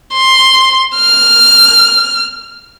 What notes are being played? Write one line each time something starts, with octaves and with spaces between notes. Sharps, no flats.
C6
F6